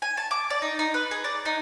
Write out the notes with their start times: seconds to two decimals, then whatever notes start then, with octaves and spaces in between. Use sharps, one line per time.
0.02 G#5
0.17 A5
0.31 D6
0.50 D5
0.62 D#4
0.79 D#4
0.94 B4
1.11 G#4
1.24 D5
1.45 D#4